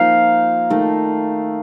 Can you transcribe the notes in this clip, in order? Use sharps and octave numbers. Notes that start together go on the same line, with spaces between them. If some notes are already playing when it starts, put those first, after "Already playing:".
Already playing: F3 A#3 D#4 F5
D#3 A3 D#4